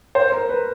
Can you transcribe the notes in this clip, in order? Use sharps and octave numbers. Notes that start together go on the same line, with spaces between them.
C5
A#4
B4